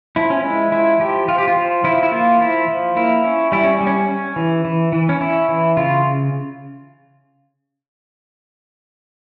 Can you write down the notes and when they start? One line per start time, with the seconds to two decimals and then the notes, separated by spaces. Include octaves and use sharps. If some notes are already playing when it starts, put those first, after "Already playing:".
0.16 F3 E4
0.30 C#4
0.44 G#3 E4
0.72 F3 E4
1.00 F3 G4
1.28 F3 F4
1.38 G4
1.48 F4
1.56 F3
1.84 F3 E4
2.03 E4
2.12 A#3 F4
2.41 F3 E4
2.68 F3
2.96 A#3 E4
3.24 C#4
3.52 G3 E4
3.64 C#4
3.81 G3
3.87 C#4
4.08 C#4
4.36 E3
4.65 E3
4.92 E3
5.09 C#4
5.21 C#4 E4
5.49 E3
5.77 C#3 F4